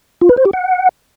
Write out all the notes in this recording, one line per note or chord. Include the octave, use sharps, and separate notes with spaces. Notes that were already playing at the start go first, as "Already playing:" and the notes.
F4
B4
C5
G4
F#5